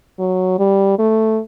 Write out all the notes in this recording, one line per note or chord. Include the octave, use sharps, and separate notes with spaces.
F#3
G3
A3